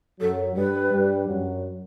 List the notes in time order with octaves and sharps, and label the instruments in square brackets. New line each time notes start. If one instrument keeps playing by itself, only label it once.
[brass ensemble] F#2 F#3 [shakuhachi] A4
[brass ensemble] G2 G3 [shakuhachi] B4
[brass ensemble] G2 G3
F#2 F#3